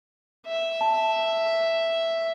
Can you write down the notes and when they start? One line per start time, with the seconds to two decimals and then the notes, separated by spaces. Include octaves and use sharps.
0.46 E5
0.81 A5